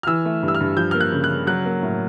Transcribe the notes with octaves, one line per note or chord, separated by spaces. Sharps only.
F6
E3 E6
A3
G2
E6
F6
G2
F3 G6
A#3 F6
F#6
C#3
F#6
C#3
F#3 F#6
A#3
A2